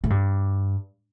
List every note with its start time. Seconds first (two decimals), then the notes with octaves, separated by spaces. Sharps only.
0.04 A2
0.10 G2